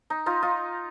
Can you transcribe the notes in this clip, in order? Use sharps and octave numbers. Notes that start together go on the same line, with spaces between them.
D#4
D#4 F4
D#4 F4